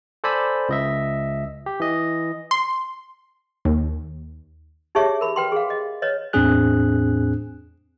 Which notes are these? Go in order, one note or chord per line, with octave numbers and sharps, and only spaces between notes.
A4 C5 D5 G#5 B5 E6
C#2 D#5 E5
G4
E3 D#5
C6
D#2
D#4 G4 G#4 C#5 E5
A#4 B5
B4 G5 C6
G#4 F5
D#5
B4 C#5 D#5
E2 A2 C4 D4 G#4 F#6